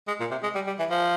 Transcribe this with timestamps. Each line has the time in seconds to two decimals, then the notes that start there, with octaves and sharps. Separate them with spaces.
0.08 G#3
0.20 A#2
0.31 C3
0.43 G#3
0.55 G3
0.67 G3
0.79 E3
0.90 F3